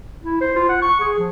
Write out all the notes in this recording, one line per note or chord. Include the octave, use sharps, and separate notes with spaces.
E4
C5
F4
F#5
C#6
G#4
F3